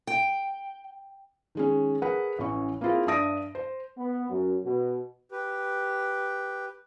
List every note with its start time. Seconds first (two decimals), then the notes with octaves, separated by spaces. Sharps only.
0.07 G5
1.55 D#3 G#3 C#4
2.02 G#4 A#4 B4 F#5
2.39 A1 E3 C#4 C#6
2.81 A#3 C4 E4 F4 G#4 A#4
3.07 G2 D4 E5 D#6 A#6 D7
3.55 C5
3.98 B3
4.30 F#2
4.64 B2
5.32 G4 B4